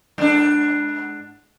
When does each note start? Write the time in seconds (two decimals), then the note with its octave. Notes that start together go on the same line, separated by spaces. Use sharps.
0.18 G#2 D4